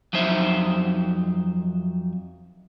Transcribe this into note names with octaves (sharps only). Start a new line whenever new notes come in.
F2 F#3 D#4 C5 E5